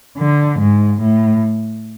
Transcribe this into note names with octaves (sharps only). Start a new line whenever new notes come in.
D3
G#2
A2